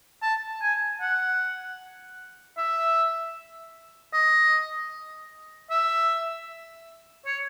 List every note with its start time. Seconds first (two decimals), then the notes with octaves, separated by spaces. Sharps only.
0.22 A5
0.62 G#5
1.01 F#5
2.57 E5
4.13 D#5
5.70 E5
7.26 C#5